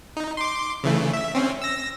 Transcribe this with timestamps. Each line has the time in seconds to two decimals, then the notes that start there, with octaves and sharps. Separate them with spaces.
0.17 D#4
0.37 C6 D6
0.84 C#3 E3 A3
1.13 E5
1.35 C4 C#4
1.62 E6 A#6